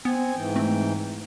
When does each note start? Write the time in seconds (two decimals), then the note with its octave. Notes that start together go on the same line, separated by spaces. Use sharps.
0.05 B3 C4 G#5
0.36 G#2 E3 G5
0.56 A3 C4